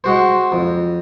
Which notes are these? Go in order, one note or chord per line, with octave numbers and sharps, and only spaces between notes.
G#3 F#4 C5
F2